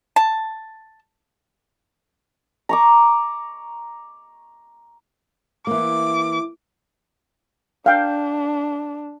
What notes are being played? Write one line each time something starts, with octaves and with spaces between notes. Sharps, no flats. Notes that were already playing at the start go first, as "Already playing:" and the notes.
A5
A#5 C#6 D6
E3 A#3 D6
D4 F5 G5